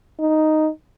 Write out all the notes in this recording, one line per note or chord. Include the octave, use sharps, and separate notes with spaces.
D#4